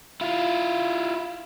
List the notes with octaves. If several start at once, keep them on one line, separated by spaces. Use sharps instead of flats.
E4 F4